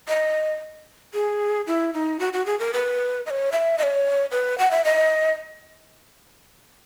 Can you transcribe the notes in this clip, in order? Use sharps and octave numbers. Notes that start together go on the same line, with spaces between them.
D#5
G#4
E4
D#4
F#4
F#4
G#4
A#4
B4
D#5
C#5
E5
D#5
C#5
B4
F#5
E5
D#5